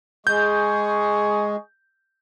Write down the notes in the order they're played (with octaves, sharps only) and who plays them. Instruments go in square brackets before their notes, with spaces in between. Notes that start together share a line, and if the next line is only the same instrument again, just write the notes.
[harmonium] G#3 [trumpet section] G#4 D#5 C#6 [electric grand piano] G6